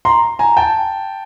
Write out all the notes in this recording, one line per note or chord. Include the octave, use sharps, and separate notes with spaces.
A#5 C6
G#5 A#5
G5 A5